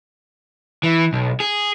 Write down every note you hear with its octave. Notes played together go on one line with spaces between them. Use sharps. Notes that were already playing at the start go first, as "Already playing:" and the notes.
E3
B1
G#4